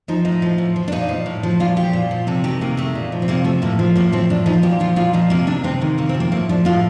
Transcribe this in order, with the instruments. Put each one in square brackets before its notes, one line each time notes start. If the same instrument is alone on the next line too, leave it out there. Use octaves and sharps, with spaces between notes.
[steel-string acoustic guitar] F3 D#4
A2 D#4
F3
A2
F3
D4
A#2 D#4
F3
A2
F3
A#2 F4
F3 G4
A#2
F3
C3 A4
D#3 G4
C3 A#3
D#3 A3
A#2
F3
C4
C3 A#3
F3 A3
A2 A#3
F3
A2 A#3
F3 C4
A2 D4
F3 D#4
A#2 G4
F3 F4
A#2 F4
F3 D#4
C3 A#3
D#3 D4
C3 C4
D#3 A#3
C3 A#3
C4
F3
A#3
A2 A#3
F3 D4
A2 F4